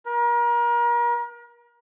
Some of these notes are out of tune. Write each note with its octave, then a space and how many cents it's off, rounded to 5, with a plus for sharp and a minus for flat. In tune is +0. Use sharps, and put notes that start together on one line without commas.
A#4 +35